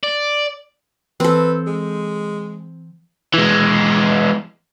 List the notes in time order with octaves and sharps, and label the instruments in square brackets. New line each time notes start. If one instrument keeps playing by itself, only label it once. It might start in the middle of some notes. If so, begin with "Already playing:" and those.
[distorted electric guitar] D5
[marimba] E3 [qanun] C4 A4 [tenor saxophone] B4
[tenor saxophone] G#3
[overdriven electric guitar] E3 G#3